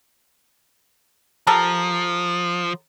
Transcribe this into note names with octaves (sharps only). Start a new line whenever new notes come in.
F3 G4 A4 A#4